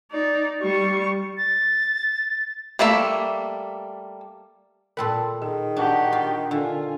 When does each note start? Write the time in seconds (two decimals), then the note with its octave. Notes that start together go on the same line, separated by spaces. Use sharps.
0.11 D#4 D5
0.61 G3 C#6
1.37 A6
2.79 G3 A3 A#3 E5
4.97 A#2 A4 A#4 G5 B5 C6
5.42 D#3 G#4
5.77 D4 F#4 G4
6.13 F4
6.51 D3 D4 F4 G#5